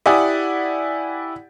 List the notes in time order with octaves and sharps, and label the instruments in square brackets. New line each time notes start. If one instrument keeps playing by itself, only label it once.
[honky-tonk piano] E4 G4 D5 F#5 G#5 D#6